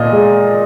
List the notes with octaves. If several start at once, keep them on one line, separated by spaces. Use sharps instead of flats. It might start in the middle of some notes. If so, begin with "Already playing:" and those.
Already playing: A#2 D#5 F5
G#3